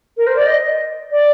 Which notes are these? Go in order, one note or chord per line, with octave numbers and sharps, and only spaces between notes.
A#4
C5
D5
D#5
D5